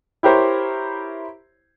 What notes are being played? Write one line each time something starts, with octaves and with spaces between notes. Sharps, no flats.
E4 G4 A#4 C5 C#5